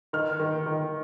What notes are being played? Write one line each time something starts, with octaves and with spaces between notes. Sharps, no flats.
D#3 F6
D#3
D#3